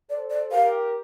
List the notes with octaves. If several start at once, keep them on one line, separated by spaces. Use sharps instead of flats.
A4 C5 D5
D5
G4 A#4 F5